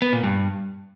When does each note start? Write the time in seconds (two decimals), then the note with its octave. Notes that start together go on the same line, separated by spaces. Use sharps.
0.02 B3
0.13 A#2
0.24 G2